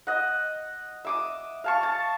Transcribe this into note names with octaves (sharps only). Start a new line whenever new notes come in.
D#5 F#5
E5 D6 D#6
F5 A5 C#6
A5